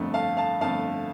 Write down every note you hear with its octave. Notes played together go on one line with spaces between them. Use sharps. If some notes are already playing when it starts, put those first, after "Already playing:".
Already playing: G1 F2 D3 A3
F5 A5
F5 A5
G1 F2 D3 A3 F5 A5